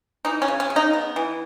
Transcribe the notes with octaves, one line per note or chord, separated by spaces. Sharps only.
E3 D#4
C#4
C#3
C#4
C#3
D#4
B3
E3